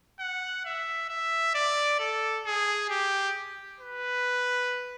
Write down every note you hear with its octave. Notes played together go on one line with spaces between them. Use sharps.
F#5
E5
E5
D5
A4
G#4
G4
B4